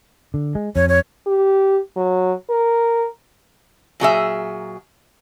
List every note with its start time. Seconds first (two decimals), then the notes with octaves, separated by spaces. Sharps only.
0.34 D3
0.55 G#3
0.76 F2 C#5
0.89 C#5
1.27 G4
1.96 F#3
2.50 A#4
4.00 A#2 F#3 G#4 E5